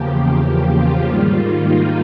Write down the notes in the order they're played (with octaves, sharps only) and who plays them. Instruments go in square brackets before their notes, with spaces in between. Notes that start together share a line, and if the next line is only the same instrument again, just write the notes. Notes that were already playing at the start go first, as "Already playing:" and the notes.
Already playing: [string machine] E2 C#3 F3 A#3 G4
G4
F4
G#2 D#3 G3 A#3 F4
D#4